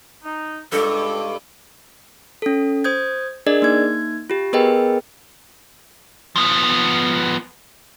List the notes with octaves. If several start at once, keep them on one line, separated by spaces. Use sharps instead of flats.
D#4
C#2 G2 G#3 A4 D6
C#4 A4
C5 D#6 G6 G#6
D4 G#4 A#4 D5 D#5
A#3 D#4 G#6
F4 G4
B3 G#4 A#4 B4 D#5 G5
F3 B3